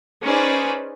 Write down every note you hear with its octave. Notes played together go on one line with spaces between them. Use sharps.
C#4 D#4 G#4 B4 C5 D5